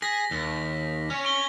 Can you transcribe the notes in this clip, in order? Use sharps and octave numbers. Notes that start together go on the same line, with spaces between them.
G#4 A#6 B6
D#2
C#4 C#5
C#6 G7